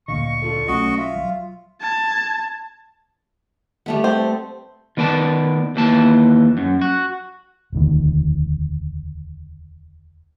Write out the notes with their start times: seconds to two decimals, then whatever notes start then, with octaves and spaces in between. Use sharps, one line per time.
0.08 D2 A#2 D3 D#5 F5 C#6
0.42 D4 F4 A4
0.68 B1 F#3 A3 C#4 F#4 D#5
0.98 F4 E5
1.16 F#3
1.81 A5 G#6
3.86 G3 A3 B3
4.04 C4
4.97 D#3 B3 D5 G#5 A5
5.76 D#2 E3 A5
6.57 F#2
6.81 F#4
7.73 E1 D2 D#3